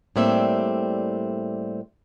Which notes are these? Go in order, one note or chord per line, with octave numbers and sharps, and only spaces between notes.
A2 G3 A#3 C4 D5 E5